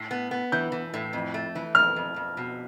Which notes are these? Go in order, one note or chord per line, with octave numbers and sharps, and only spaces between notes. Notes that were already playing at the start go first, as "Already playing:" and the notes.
Already playing: A2
B3
B3
E3 G6
E3
A2
F2
A3
E3
F2 F6
F2
F2
B2